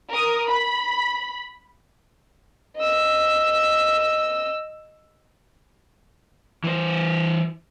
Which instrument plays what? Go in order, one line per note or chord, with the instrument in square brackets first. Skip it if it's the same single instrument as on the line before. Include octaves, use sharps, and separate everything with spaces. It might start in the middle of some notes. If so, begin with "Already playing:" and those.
[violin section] A#4 D#6
B5
[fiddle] D#5 E6
[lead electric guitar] E3 C5